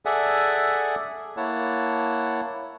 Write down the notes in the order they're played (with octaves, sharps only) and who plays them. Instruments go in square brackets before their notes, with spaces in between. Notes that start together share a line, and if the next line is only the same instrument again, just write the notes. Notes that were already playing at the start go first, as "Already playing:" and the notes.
[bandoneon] G#4 A4 D5 E5 F#5 G#5
A#3 E4 C#5 F#5 A5